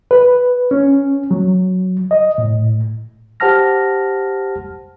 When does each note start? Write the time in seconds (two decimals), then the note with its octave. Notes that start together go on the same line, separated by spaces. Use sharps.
0.11 B4
0.71 C#4
1.31 F#3
2.11 D#5
2.38 A2
3.40 G4 C5 F#5 A5 F6 A#6